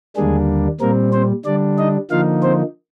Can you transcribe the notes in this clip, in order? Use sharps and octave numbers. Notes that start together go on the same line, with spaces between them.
D#2 D3 G3 G#3 A#3 D4 G#4
A#2 G3 A#3 C4 A#4
C4 C5
D3 G3 D4 D5
D#4 D#5
D3 F3 A#3 D#4 F4 F5
C4 C5